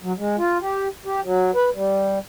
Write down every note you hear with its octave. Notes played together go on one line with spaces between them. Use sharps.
F#3
G#3
F4
G4
G4
F#3
B4
G3